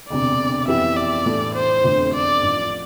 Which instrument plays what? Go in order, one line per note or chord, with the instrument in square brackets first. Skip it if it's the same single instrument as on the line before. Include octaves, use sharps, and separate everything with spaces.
[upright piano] E1 D2 C3 [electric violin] D5
[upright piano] F2 E3 B3 E4 G4 [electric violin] E5
[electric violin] D5
[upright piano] A2 E3 A3 D4
[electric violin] C5
[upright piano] F1 E2 D3 A3 C4
[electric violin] D5
[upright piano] A1 G2 F3